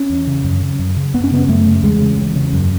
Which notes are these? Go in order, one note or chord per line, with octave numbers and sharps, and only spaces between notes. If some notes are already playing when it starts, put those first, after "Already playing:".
Already playing: C#4
E2
C#3
F#2
C#3
F#2
C#3
F#2 B3
C#4
C#3 B3
F#2 A3
C#3
E2 G#3
C#3
E2
C#3
F#2